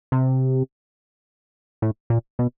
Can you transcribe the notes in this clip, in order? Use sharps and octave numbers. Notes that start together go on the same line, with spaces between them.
C3
A2
A#2
B2